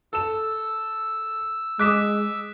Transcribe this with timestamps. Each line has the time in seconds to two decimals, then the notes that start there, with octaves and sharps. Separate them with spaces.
0.13 A4 E6 E7
1.79 G#3 D6 D#6 F#6 B6 E7